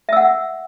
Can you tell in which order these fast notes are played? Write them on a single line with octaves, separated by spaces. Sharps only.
E5 E6 F#5